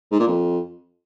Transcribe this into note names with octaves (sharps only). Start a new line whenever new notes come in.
G#2
A#2
F2